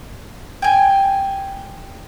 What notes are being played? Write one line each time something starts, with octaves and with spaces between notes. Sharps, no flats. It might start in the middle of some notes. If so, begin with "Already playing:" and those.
G5 G#5